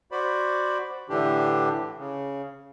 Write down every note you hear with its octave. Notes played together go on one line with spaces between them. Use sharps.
F#4 C5 D5 B5
A2 D3 E3 D4 G4
C#3